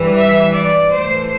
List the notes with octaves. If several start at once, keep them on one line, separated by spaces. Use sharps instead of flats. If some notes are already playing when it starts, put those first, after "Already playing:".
Already playing: G2 E3 G3
E5
D5
A2 E3 A3 C5